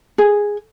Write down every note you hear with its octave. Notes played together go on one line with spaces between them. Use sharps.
G#4